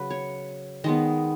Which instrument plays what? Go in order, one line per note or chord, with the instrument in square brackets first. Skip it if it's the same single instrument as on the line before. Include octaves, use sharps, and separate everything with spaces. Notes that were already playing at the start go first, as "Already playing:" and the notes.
Already playing: [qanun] C#3 F#3 B4
C#5
D#3 G#3 B3 D#5